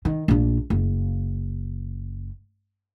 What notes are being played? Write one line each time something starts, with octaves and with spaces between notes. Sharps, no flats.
D#3
A#1 D4
F#1